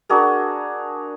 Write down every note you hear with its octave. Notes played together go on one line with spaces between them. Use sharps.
D4 F#4 G#4 A#4